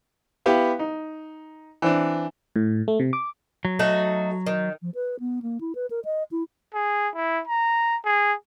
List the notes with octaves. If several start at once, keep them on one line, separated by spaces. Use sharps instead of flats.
B3 E4 G4 B4 F5
D#4
E3 C4 D4
A2
A3
C3
D6
F#3
A3 D#4 F#4
D#3
F3
B4
B3
A#3
E4
B4
A#4
D#5
E4
G#4
E4
A#5
G#4